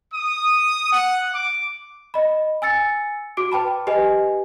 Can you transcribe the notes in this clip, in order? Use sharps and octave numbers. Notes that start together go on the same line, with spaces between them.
D#6
F#5
D6
D#5 B5
G#5 E6 A6 C#7
F#4 D6 D7
B4 G5 A5 B5
G4 B4 D#5 G#5